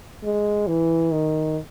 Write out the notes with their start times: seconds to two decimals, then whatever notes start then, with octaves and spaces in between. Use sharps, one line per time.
0.24 G#3
0.67 E3
1.12 D#3